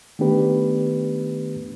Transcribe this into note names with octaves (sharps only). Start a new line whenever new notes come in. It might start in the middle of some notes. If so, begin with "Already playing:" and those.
D#3 A3 B3 D4 G4 B4